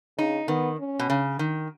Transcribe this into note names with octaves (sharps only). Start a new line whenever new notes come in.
C#3 D#4
D#3 B3
C#4
B2
C#3
D#3